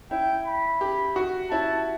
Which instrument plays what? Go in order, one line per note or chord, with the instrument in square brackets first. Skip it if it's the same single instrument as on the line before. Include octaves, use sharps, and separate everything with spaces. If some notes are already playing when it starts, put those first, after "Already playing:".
[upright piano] E4 [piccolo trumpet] G5
[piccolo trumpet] B5
[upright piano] G4
F#4
[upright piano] E4 [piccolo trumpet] A5